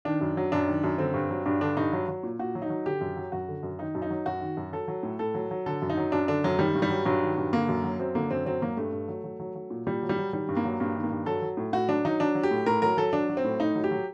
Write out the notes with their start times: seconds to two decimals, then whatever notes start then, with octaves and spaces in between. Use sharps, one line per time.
0.05 D#3 D4
0.21 F#2
0.37 F#3
0.52 F#2 D4
0.68 D#3
0.84 F#2
0.98 D3 C4
1.14 G2
1.31 F#3
1.46 G2 D4
1.61 D3 D4
1.77 G2 D#4
1.93 F#3
2.08 F#3
2.23 A#2
2.39 A#2 F#4
2.55 F#3
2.62 D#4
2.70 F#3
2.86 D3 G4
3.01 F#2
3.17 F#3
3.32 F#2 F#4
3.48 D3
3.63 F#2
3.79 D#3 D#4
3.95 F#2
4.02 D#4
4.10 F#3
4.26 F#2 F#4
4.41 D#3
4.57 F#2
4.72 F#3 A4
4.88 F#3
5.03 A2
5.19 A2 A4
5.34 F#3
5.51 F#3
5.66 D3 A4
5.82 F#2
5.90 D#4
5.97 F#3
6.12 F#2 D4
6.28 D3 D4
6.44 F#2 F#3
6.59 D#3 G3
6.75 G2
6.82 G3
6.90 F#3
7.05 G2 F#3
7.21 D#3
7.38 G2
7.53 D3 A#3
7.68 F#2
7.84 F#3
7.99 F#2 C4
8.15 D3 A#3
8.31 F#2 C4
8.46 F#3 C4
8.62 F#3 A#3
8.77 G2 A3
8.93 G2
9.08 F#3
9.24 F#3
9.40 F#3
9.55 F#3
9.70 A#2
9.87 A#2 G3
10.03 F#3
10.09 G3
10.18 F#3
10.33 D#3 G3
10.49 G2
10.56 A#3
10.65 F#3
10.80 G2 A#3
10.96 D#3
11.03 A#3
11.11 G2
11.26 F#3 A4
11.42 F#3
11.57 A2
11.73 A2 F#4
11.88 F#3 D4
12.05 F#3 D#4
12.20 F#3 D4
12.35 F#3
12.43 G4
12.51 A2
12.66 A2 A#4
12.82 F#3 A#4
12.97 F#3 A4
13.13 F#3 D4
13.29 F#3
13.37 C4
13.44 A2
13.60 A2 D#4
13.75 F#3
13.84 G4
13.91 F#3